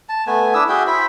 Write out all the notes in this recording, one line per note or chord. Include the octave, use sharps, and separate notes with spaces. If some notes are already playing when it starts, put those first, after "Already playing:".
A5
A3 B3 G#5
D4 E4 D#6 E6
F#4 G#4 E5 G5
E4 C5 E5 B5